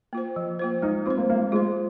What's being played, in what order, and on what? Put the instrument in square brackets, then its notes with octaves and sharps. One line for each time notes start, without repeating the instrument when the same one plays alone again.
[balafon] A#3 F4 C5
F3
A#3 F4 C5
[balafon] G#3 [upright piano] D#4
[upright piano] C4 [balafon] F4
[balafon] C5
[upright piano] A#3
[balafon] G#3 [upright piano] A#3
[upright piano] G#3 [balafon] F4
[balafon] C5